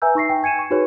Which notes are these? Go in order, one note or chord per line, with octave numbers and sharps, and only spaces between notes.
B4 E5 G#5 A#5 E6 G6
D#4 C#6 A#6 C7
G5
G#5 G#6 C#7 D#7 E7
C#6
D#4 F#4 G#4 B4 C#5